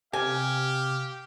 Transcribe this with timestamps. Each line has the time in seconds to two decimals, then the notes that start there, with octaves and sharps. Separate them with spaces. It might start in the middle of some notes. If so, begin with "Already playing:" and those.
0.13 C3 G4 F5 G#5